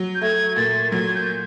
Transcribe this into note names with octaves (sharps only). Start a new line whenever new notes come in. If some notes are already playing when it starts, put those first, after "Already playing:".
Already playing: F#3
G6
A3 G#6
A#2 A6
F#3 G#6
G6